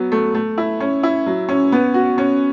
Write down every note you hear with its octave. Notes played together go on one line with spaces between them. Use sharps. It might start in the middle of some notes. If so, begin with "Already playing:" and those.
Already playing: F#3 B3
A3
A3
E4
C#4
E4
F#3
C#4
B3
F#4
C#4